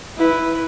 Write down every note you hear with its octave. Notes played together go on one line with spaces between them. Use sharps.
E4 B4